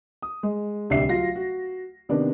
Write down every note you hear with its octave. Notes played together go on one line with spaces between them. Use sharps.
D#6
G#3
D1 C2 D4 E5 C7
F#3 F4 A#6
F#4
C3 D#3 B3 D4